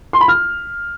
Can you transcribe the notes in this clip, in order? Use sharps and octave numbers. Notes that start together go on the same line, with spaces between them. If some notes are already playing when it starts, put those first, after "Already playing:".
C6
B5
F6